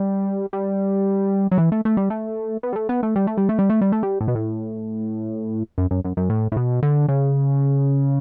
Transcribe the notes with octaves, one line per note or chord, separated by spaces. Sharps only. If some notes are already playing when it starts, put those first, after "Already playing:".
Already playing: G3
G3
F#3
E3
A3
A3
G3
A3
B3
G3
A3
B3
A3
G3
A3
G3
A3
G3
A3
G3
A3
G3
A2
B2
A2
F#2
F#2
F#2
F#2
A2
A2
B2
D3
C#3